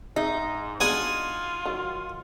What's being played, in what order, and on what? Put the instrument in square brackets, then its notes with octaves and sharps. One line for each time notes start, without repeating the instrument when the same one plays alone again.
[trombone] G#2 [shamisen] G#3 E5 [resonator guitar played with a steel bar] D#4
[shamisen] G#3 B3 D4 [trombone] F4 [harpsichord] F#4 G#5 D#6
[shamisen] D#3 F#3